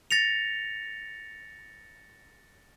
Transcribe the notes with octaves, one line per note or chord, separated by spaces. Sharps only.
A6 A#6 C#7 F7